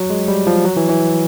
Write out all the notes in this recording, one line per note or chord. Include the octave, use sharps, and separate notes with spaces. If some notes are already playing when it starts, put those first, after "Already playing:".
Already playing: F#3
G#3
G3
F3
F#3
E3
E3